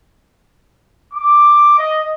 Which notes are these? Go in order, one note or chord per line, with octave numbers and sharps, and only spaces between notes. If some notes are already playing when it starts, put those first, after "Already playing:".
D6
D#5